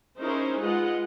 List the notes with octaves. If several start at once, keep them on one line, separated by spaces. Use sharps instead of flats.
C#4 D#4 E4 G#4 A#4 C5
G#3 F4 B4 D#5 F#5